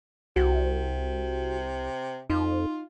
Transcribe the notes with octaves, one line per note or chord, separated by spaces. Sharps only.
C2 C3 F#4
F2 D#4 F4